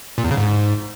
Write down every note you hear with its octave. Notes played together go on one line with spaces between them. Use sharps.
A#2
E2
C#3
G#2